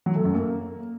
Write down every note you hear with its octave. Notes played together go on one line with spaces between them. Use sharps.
F#3
A3
F#2
A#3